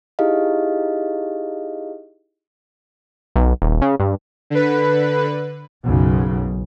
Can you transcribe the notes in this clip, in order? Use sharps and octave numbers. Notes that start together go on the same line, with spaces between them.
D#4 E4 G4 G#4 D#5 F5
B1
D#1
C#3
G2
D3 B4
B1 F#2 C#3